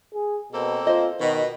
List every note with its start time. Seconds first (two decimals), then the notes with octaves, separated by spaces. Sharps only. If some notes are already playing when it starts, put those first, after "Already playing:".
0.14 G#4
0.52 B2 A#3 C4 A4
0.87 F4 C5 D#5
1.20 B2 D#3